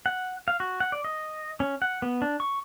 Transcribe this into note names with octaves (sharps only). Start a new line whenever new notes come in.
F#5
F5
F#4
F#5
D5
D#5
C#4
F#5
B3
D4
C#6